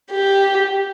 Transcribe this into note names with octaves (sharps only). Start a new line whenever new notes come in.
G4